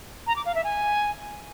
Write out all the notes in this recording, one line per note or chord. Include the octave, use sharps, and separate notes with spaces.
A#5
D6
F5
E5
G#5